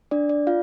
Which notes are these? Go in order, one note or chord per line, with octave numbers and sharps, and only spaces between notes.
D4 D5
D5
F4 F5